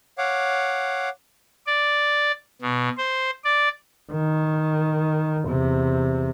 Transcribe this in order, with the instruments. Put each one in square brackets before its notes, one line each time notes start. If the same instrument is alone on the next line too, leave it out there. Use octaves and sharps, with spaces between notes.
[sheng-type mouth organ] C#5 F5 F#5 D6
[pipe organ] D5
B2
C5
D5
[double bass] D#3
E2 C3